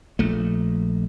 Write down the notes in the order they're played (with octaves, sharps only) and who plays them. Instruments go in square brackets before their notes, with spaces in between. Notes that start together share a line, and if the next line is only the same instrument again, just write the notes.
[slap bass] A#1 A3